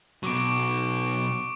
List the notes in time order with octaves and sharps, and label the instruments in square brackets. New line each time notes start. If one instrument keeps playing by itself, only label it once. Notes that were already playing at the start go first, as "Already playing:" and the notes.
[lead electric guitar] B2 F#3 [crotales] C#6 D6 D7